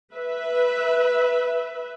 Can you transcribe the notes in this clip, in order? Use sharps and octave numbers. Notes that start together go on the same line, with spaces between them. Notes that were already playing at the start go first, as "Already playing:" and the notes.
B4 E5